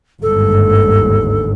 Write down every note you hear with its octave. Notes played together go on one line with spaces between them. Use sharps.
G1 D#2 G#2 A4